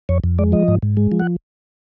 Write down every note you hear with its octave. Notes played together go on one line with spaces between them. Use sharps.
F2 C#5
F2
G#3 D5
F3 D#5
G#2
G#2
G#3
F3
F#5